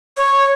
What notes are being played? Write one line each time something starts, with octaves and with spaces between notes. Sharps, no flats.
C#5